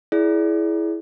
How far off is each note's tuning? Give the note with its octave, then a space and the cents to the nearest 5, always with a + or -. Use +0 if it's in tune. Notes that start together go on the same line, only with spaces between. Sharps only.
E4 +0 G#4 +20 D5 -10